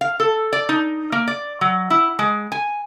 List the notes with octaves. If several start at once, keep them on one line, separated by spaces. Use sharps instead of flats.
F5
A4
D5
D#4
A#3
D5
F#3
E4
G#3
G#5